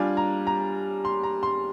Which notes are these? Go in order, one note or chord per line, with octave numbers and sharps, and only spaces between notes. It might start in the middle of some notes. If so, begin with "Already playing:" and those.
Already playing: G3 D4 F4 G#5
A#5
A#5
C6
A#5
C6